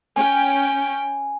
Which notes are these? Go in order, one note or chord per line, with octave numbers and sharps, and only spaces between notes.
C#4 G5 G#5